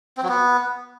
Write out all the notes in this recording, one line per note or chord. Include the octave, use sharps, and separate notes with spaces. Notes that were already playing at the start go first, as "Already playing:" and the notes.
C4
F#3
B3